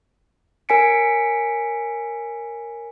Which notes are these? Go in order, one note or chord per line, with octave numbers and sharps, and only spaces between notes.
A#4 C#5 G#5 B6 C#7 D7